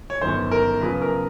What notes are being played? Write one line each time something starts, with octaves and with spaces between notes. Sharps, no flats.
C#5
G1 F#2 D#3 C5
A#4
F#2 C#3 F3 B4
A#4